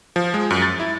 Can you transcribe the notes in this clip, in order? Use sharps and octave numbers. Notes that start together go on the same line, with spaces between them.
F3
G#3
F#2
A6
E4